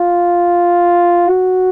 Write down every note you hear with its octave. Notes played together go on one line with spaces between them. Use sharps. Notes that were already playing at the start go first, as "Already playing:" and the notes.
Already playing: F4
F#4